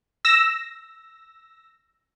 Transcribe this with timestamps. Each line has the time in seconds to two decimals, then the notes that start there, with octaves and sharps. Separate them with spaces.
0.25 E6 A#6